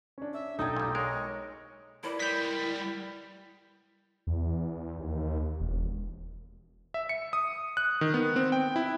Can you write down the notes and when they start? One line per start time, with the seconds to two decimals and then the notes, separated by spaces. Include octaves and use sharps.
0.18 C#4 D4
0.34 E5
0.59 B1 D#4 A4 D#5 G5 G#6
0.76 A#2 G3
0.95 G#3 A#4 C#5
2.04 E4 A#4 B4 D5
2.20 G3 G#3 G6 B6
4.27 E2
4.99 D#2
5.60 E1
6.94 E5
7.09 C#7
7.33 D#6
7.77 F#6
8.01 D#3
8.14 B3
8.36 C4
8.52 G5
8.76 E4